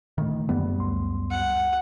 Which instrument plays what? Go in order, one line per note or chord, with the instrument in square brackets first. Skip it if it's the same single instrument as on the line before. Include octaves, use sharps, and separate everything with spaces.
[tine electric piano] A#2 D3 A3 [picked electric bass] D#3
[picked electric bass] F#2 G3 B3
[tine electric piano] C#2 C6
[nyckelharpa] F#5